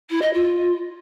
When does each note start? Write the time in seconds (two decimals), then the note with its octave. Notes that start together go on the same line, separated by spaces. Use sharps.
0.10 E4
0.21 D#5
0.33 F4